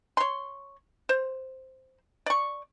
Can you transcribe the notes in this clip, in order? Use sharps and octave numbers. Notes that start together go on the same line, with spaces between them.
C#5 C6
C5
D5 C#6